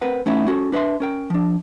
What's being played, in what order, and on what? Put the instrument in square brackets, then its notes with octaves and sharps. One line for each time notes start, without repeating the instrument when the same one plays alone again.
[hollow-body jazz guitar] C4 A#4 B4 F#5
A3 B3 C#4 D#4 E4
C#4 F#4 G#4 A4
D4 B4 C#5 E5 C6
C#4 A#4 G5
F3 D4